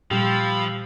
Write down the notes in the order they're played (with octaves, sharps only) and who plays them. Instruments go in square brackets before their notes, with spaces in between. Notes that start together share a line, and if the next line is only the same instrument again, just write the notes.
[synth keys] A#2 G3 [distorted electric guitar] F3 [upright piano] G4 [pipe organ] F5 B5 E6